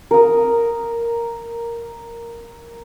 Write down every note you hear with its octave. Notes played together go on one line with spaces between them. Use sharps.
A#4 D#6